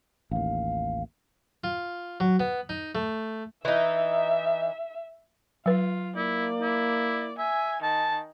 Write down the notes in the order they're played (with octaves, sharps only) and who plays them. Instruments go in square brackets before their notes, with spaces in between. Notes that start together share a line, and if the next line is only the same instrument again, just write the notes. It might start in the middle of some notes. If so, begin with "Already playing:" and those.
[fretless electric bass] A1 D#2 [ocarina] F5
[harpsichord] F4
F#3
B3
D#4
A3
[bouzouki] E3 D#4 [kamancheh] E5
[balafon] F#3 B4 [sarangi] F4
[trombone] A#3 [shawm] E4 [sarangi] D5
[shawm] E4
[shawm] E5 [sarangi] G#5
[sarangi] D#3 [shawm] A5